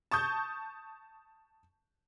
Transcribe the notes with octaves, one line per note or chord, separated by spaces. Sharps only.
A5 C#6 D#6 G6